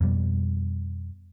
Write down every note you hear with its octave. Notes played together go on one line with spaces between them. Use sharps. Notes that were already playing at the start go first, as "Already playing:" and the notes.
F2 B2 G3